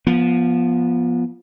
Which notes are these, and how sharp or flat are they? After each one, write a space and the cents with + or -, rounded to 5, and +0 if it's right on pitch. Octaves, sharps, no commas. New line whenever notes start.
F3 +0 B3 -30